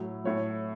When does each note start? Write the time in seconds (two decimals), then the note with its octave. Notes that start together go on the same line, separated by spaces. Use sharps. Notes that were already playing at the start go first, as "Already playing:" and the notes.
Already playing: A2 F#3
0.24 A2 F#3 C#5